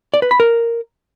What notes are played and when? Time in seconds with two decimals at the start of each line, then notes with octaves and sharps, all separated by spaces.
0.14 D5
0.22 B4
0.31 B5
0.40 A#4